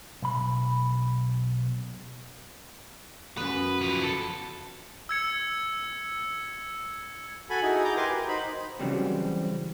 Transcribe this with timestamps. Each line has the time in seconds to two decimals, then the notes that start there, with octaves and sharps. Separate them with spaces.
0.22 B1 B5
3.37 F#2 B3 B4
3.81 F3 B4
4.03 A4
5.09 E6 G#6 C#7
7.50 F#4 A4 G#5 B5
7.63 D#4 E4 F#4 G#4
7.84 A#5 D6 G6
7.97 G4 A#4 B4 G#5 C6 D6
8.09 F#4
8.28 D#4 C5 B5
8.79 C#3 E3 F#3 G3 C4